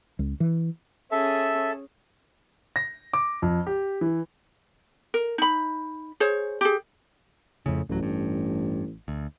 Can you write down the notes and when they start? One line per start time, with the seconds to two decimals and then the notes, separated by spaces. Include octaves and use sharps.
0.19 C#2
0.40 E3
1.12 C#4 G#4 A4 E5 A5
2.76 A#6
3.13 D6
3.42 F2
3.67 G4
4.01 E3
5.14 A#4
5.38 D#4 B5
6.20 G#4 C5 C#5
6.61 G4 G#4
7.66 F2 A2 C#3
7.89 D1 A1 F#3
8.03 G2
9.08 D2